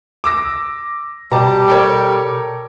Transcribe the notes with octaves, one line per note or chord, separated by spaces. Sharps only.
D6 E6 A#6
B2 G3 G4 A5 A#5
A4 A#4 C#5